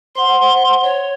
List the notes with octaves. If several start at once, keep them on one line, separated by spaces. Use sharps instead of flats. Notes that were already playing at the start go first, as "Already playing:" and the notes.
C5 F#5 C6
C#5